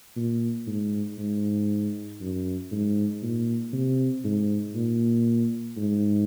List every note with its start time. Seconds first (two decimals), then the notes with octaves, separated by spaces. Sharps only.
0.16 A#2
0.67 G#2
1.18 G#2
2.21 F#2
2.72 G#2
3.22 A#2
3.73 C3
4.25 G#2
4.75 A#2
5.77 G#2